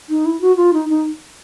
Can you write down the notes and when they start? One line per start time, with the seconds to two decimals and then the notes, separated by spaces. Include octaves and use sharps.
0.09 D#4
0.26 E4
0.41 F#4
0.57 F4
0.73 D#4
0.89 D#4